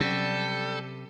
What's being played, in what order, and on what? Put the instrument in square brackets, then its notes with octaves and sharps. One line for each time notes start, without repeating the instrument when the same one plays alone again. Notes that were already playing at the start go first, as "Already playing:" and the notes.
[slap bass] C3 [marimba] F#3 C#4 D5 [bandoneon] G3 G6 [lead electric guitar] A4